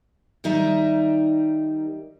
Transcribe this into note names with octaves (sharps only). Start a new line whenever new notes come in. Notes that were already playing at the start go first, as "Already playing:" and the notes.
D#3 G3 D#4 D#5 E5